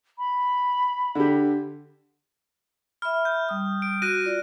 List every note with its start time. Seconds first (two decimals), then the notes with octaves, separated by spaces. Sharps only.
0.18 B5
1.15 D3 G4
3.02 E5 B5 F6
3.25 G6
3.49 G3 D#6
3.82 D7
4.02 F#4 F#6 A#6 D#7
4.25 F4 D5